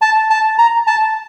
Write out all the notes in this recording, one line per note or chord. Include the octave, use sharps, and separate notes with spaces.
A5
A5
A#5
A5